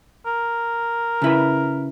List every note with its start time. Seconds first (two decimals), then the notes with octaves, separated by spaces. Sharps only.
0.26 A#4
1.22 C#3 E4 B4